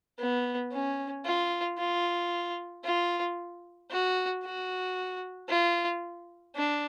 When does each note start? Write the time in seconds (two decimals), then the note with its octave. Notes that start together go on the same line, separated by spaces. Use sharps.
0.19 B3
0.72 C#4
1.25 F4
1.78 F4
2.84 F4
3.90 F#4
4.44 F#4
5.49 F4
6.56 D4